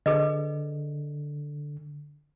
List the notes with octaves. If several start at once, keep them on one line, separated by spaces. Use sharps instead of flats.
D3 G#4 B4 D#5